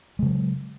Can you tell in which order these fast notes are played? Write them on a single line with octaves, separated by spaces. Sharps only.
G#3 C#3 F#3